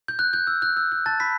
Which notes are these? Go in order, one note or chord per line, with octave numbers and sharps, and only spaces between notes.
G6
F#6
G6
E6
F#6
E6
F#6
A5 A6
B5 B6